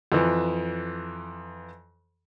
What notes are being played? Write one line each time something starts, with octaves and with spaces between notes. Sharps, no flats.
F2 E3